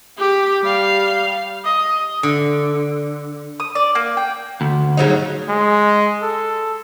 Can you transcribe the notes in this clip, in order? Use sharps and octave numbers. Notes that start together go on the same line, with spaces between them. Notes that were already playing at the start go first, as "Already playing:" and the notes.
G4 D6
G3 F5
D#5
D3
D#6
D5
A#3
G5
D2
C#3 F#3 D#4
G#3
A4